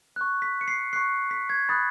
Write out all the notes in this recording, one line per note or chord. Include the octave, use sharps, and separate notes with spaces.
C#6 F#6
B6
C#7
C7
C#6 F#6 C7
B6
G#6
B5 D#6 F#6 A6